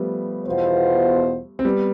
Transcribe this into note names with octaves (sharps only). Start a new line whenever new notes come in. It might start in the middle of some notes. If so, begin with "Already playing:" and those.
Already playing: F3 G3 A3 B3
E2 B2 B3 F4 C5
C4
G3 B3